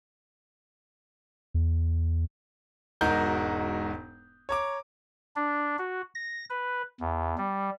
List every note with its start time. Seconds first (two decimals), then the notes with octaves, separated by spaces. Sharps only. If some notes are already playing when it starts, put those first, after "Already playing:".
1.54 E2
3.01 E1 G#2 D#4 F#4 A#4 G6
4.49 C#5 A#5 D6
5.36 D4
5.79 F#4
6.15 A#6
6.50 B4
7.00 E2
7.38 G3